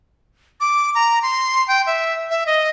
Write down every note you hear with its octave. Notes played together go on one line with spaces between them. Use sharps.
D6
A#5
C6
G5
E5
E5
D#5